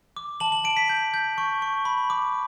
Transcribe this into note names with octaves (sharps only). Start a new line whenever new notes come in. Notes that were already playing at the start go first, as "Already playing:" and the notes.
D6
A5 F#7
F#7
A5 D7
B6
G6
G6
C#6
C#6
B5
D6